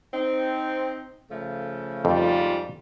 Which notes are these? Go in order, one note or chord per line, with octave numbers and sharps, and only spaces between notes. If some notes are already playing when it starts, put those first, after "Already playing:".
C4 D#4
C#3 F3 A3
F2 G#2 G3 F4